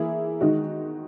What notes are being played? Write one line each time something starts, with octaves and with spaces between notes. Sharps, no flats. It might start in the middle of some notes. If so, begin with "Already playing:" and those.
Already playing: E3 A#3 E4 G#4
D#3 G#3 D#4 F#4